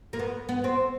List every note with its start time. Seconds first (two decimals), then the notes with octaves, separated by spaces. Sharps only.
0.13 A#3
0.19 B3
0.49 B3
0.64 C4